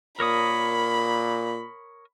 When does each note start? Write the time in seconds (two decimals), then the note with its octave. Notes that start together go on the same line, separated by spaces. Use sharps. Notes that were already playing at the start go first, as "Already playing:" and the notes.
0.20 A#2 A#4 C#5 B5 D#6